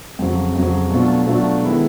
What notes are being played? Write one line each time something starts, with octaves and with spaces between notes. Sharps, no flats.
F2 C#3 F#3
F2 C#3 F#3
B2 F#3 A3 D4 F4
B2 F#3 A3 D4 F4
D#3 G#3 B3 E4 A4